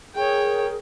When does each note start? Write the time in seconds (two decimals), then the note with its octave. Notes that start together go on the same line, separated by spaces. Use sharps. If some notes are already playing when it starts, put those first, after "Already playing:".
0.15 G#4 A#4 C#5 G5